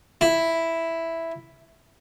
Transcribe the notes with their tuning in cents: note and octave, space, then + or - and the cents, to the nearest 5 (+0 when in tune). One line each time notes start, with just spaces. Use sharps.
E4 +0